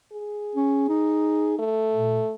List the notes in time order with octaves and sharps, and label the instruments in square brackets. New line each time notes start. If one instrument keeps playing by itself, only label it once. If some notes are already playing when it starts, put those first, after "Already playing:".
[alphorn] G#4
[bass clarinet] C#4
D#4
[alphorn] A3
[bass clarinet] A#2